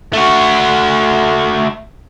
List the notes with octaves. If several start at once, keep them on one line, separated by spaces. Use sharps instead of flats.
A3 F#4